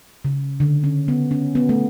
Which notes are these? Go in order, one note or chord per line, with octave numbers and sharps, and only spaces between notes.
C#3
D3
C#4
B3
C#4
B3
A3